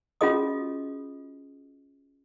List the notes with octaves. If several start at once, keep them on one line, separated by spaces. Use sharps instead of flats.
C#4 F4 F#4 G#4 D#5 D#6